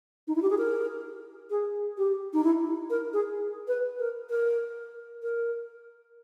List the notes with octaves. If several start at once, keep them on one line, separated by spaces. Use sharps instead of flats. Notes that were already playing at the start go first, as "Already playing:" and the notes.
D#4
E4
G4
G#4
A#4
G#4
G4
D#4
E4
A#4
G#4
B4
A#4
A#4
A#4